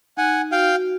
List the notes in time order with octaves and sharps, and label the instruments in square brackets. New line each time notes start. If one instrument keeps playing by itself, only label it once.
[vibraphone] D#4 [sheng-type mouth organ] F#5 G#5
[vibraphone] F#4 [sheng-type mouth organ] F5 G5